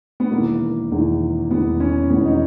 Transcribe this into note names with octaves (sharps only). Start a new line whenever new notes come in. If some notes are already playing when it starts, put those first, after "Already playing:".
B3
E1 E2 D#3 A#3
E1 E2 D#3
E1 E2 D#3 B3
C#4
E1 E2 D#3 B3
D#4